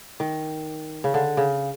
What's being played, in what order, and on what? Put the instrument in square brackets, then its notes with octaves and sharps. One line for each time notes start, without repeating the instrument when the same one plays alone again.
[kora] D#3
C#3
D3
C#3